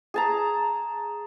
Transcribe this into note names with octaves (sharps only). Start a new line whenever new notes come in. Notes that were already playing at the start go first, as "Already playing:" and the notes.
G#4 A5 A#5